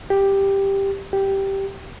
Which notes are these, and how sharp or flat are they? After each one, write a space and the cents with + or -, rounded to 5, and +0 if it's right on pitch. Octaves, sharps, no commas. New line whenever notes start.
G4 +5
G4 -5